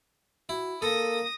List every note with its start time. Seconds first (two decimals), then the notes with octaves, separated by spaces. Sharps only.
0.49 E4 F#4
0.82 A#3 A4 D#6 A#6